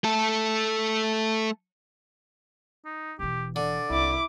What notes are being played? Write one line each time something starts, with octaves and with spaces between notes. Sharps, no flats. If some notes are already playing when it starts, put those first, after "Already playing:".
A3 A4
D#4
E1 E3 G4
D3 D5
C2 E4 D6